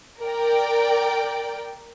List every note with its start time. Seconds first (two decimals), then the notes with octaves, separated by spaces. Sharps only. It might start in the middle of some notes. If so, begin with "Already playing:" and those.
0.21 A#4 D5 G5